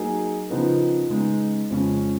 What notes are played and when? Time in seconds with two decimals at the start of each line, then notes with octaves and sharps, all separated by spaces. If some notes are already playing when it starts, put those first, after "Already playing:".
Already playing: F#3 A#3 D#4 G#4
0.50 C#3 F3 B3 D#4 A#4
1.10 C#3 G#3 B3 D#4
1.70 F2 C#3 G#3 C#4